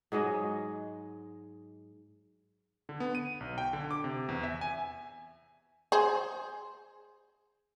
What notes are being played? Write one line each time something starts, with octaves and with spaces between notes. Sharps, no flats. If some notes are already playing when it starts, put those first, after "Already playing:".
G#2 F#3 G#3 D#5
D3
B3
D#7
B1
G5
D3
D6
C3
E2
E5
G#5
G#4 C5